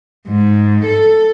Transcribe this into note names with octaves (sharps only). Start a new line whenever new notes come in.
G#2
A4